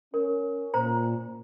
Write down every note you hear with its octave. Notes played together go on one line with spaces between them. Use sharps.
C#4 A#4
A#2 C5 A#5